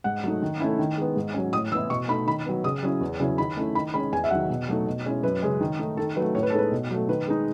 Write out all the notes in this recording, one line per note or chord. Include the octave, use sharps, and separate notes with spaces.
G#2 F#5
F#3 A3 D#4
D#3
A3 C#4 E4
D#3
G#3 B3
G#2
F#3 C#4
A2 D#6
E3 B3 E4 E6
B2 C#6
A3 D#4 B5
D#3 B5
F#3 B3
C#3 D#6
F#3 C#4 E4
E2
C#3 F#3 C#4 E4
D#3 B5
A3 C#4 E4
D#3 B5
G#3 C#4 B5
E2 G#5
E5
D#3 F#3 F#5
B2
F#3 A3 D#4
B2
G#3 C#4 E4
F#2 B4
C#3 G#3 C#4
D#3
A3 D#4
D#3 A4
F#3 A3 B4
A2 C#5
B4
A4
G#3 B3 D#4 B4
B2
F#3 A3
D#3 B4
G#3 D#4